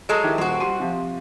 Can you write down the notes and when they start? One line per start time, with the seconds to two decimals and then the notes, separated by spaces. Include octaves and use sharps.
0.09 F#3 G#3 A4
0.24 D#3 E4 G4
0.38 D#1 C4 F#4
0.60 G3 C6 D#7
0.80 C3 F3